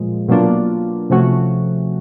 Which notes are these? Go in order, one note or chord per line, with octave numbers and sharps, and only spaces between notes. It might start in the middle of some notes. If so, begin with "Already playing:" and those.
Already playing: A#2 F3 G#3
B2 F#3 A#3 D4 F4
C3 F3 A3 C#4 F#4